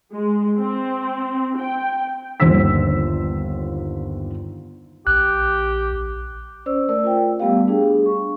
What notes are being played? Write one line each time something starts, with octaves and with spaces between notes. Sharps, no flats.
G#3
C4
G5
G1 D#2 D3 C5 E6 B6
A#1 G4 F#6
C#4 C5 D5 E6
A3 A#4 D5 E6
F4 G5
G3 A3 B3 G4 F5
D4 G#4
C#6